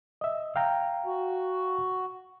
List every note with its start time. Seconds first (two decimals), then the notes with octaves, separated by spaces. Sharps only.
0.21 D#5 E5
0.56 F5 G5 A#5
1.06 F#4